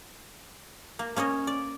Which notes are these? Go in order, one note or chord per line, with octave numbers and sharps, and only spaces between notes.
A#3
A#3 C#4 C#5 D#5
D5